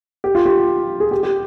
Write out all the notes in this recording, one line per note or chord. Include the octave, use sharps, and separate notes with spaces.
G4
F4
G4
G#4
G4
G4